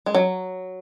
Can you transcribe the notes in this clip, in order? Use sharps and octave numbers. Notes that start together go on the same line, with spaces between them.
G#3
F#3